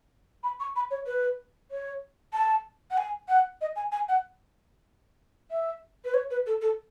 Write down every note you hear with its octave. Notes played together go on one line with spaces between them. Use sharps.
B5
C#6
B5
C#5
B4
C#5
A5
F#5
G#5
F#5
D#5
G#5
G#5
F#5
E5
B4
C#5
B4
A4
A4